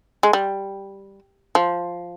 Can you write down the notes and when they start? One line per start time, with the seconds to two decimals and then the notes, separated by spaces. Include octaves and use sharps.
0.23 G#3
0.33 G3
1.55 F3